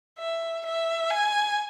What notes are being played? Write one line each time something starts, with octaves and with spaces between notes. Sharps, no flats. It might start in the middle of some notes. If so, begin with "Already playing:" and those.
E5
E5
G#5